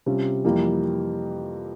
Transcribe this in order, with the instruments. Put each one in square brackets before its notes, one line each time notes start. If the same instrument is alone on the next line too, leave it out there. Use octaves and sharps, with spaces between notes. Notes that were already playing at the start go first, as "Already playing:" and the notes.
[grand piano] C3 G3 C#4 F4
F2 E3 G3 A#3